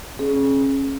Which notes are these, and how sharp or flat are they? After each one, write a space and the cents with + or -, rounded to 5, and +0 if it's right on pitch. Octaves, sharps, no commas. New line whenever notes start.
C#4 -30 G#4 +20